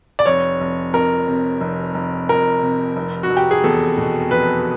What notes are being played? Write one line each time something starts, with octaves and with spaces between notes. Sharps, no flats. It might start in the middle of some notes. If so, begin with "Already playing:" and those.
D5
F1 C#5
F1
F2 A#4
C3
F1
F1
F2 A#4
C3
F1
F#4
F1
G4
G#4
E2 A4
B2
F1 B4